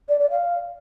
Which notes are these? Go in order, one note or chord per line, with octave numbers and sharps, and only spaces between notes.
D5
D5
F5